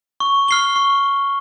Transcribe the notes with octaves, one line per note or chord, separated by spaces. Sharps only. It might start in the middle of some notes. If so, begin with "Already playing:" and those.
C#6
F6 C7 G7
C#6